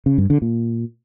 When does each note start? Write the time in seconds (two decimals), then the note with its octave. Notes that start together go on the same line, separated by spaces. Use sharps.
0.06 C#3
0.18 G2
0.30 D3
0.42 A#2